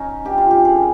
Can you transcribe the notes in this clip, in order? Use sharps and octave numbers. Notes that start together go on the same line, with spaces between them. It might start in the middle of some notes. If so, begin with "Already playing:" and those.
Already playing: C#4 D#4
G2 G4
F4
G4
D#3 G#4